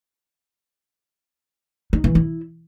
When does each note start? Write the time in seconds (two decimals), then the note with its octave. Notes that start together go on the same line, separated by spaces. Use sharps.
1.93 D#4
2.04 E3
2.15 E4